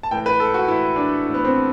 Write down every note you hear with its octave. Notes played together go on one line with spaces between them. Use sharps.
A5
A2 E3 G5
B4
A4
F#4
A2 E3 E4
D4
A2 E3
B3
C4